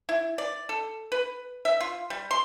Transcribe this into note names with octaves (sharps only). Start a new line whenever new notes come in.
E4
D5
A4
B4
E5
F4
G3
C6